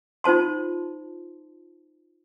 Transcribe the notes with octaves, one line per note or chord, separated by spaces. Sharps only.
D#4 F4 C5 A5 C6